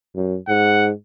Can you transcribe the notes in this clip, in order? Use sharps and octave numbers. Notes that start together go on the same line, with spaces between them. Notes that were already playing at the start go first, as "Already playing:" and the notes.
F#2
G#2 F#5